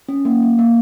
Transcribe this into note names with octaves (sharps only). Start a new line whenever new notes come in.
C#4
A#3
A#3
A#3